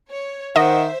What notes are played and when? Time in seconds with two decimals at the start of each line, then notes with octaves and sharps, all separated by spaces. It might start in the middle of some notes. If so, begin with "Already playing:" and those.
0.11 C#5
0.56 D#3 C5 D#5 E5 F#5